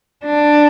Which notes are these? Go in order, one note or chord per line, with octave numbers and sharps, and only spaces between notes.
D4